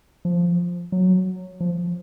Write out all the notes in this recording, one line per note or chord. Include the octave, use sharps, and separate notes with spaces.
F3
F#3
F3